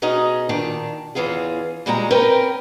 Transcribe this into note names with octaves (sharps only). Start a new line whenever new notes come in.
B2 C#4 D#4 G#4 D#5
A#2 D#3 D4
E2 E3 C#4 F4 G#4
A#2 G3 G#3 C#4 A#5
C4 C#4 A#4 B4 G5